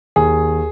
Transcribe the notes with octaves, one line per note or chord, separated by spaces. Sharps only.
D#2 G#4